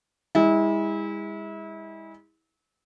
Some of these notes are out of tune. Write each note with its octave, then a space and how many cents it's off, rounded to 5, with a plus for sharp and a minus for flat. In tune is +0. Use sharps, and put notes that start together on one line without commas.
G#3 -35 E4 -30